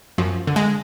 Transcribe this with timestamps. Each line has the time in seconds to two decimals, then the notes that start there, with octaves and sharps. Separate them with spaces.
0.18 F#2 F3
0.47 D3
0.56 G#3